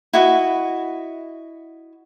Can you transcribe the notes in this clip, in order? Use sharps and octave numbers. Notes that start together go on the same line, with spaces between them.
E4 F#4 D#5